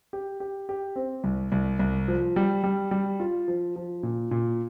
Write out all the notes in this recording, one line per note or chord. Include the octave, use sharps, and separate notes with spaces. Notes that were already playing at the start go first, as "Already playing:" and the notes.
G4
G4
G4
C4
C2
C2
C2
F3
G3
G3
G3
F4
F3
F3
A#2
A#2